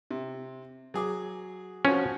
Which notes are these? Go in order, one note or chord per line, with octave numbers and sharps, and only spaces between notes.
C3
F#3 G#4 D6
F3 C4 C#4 F#4